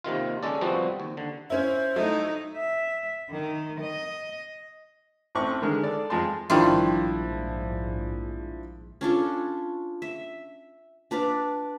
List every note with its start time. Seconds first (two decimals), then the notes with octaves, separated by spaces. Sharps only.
0.04 D#2 C3 D#3 F4
0.43 G#3 C#4 A4 D5
0.61 F3 G3 B3 C4 F#4
1.00 D#2
1.17 D3
1.50 C#4 E4 C5
1.96 F#3 A3 D#4 E4
2.57 E5
3.29 D#3
3.81 D#5
5.35 A1 C4 C#6
5.62 D3 D#3 G#3 F6
5.83 A4 D5
6.10 F2 G#3 F4 G#4 A5 C6
6.50 A#1 G#2 D#3 F3 G3 D4 E4 F4
9.01 C#4 D4 F4 A4
10.02 E5
11.11 D4 B4 D5 F5